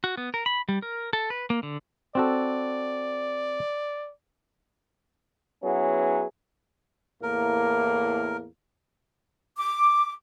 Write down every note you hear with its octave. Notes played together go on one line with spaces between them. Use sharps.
F#4
B3
A#4
B5
G3
A#4
A4
B4
A#3
D3
C4 F#4 A4 D5
F#3 B3 C#4 E4 G#4
E2 A2 A#3 A#4
D6